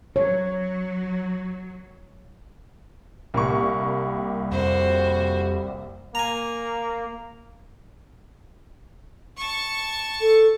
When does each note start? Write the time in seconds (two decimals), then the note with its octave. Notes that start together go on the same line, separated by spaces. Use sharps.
0.16 F#3 C#5
3.34 C2 G3 A#3 C#6
4.51 F2 F#4 C5
6.15 A#3 G#5 A#5
9.37 A5 C#6
10.21 A4